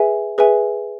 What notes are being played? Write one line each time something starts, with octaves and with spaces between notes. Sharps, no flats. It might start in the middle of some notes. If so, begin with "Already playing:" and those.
Already playing: G#4 B4 E5 G#5
G#4 B4 E5 G#5